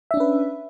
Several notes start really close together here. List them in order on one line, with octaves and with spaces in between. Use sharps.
E5 D4 C#4 B4